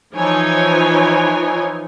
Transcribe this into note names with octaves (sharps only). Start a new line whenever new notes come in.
E3 F3 D#4 C#5 G#5